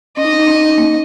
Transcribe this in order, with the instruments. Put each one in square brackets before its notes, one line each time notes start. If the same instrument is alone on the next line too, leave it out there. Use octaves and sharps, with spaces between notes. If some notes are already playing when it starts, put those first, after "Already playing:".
[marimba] C#4 [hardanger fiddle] D#5
[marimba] D#4
C#4
D#4
C#4
D#4
C#4
D#4
A#3 C#4